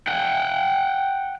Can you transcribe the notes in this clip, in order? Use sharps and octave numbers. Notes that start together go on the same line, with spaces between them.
F#5 G5